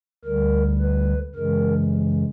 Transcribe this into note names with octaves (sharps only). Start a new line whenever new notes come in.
D2 D3 G3 A#4
B4
F#2 C#3 E3 G#3 A#4